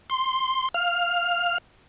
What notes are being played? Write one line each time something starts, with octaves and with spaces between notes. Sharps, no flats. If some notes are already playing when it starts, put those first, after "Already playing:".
C6
F5